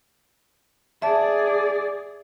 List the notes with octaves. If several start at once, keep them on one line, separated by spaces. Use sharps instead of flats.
G#4 D5 E5 A5